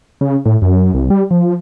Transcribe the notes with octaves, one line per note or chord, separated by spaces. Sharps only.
C#3
A2
F#2
C2
G3
F3